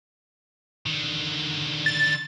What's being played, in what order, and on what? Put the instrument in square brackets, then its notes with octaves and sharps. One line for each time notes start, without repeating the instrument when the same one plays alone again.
[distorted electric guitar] D3 D#3
[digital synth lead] A6